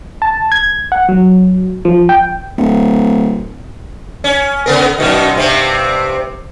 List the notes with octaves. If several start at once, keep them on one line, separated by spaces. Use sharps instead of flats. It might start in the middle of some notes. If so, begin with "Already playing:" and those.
A5
G#6
F#5
F#3
F3
G5
D1
C#4
C#3 B3 A#4
F#2 B2 D#3
G2 C3 C4